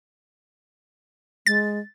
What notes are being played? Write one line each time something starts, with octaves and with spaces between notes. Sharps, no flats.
G#3 A6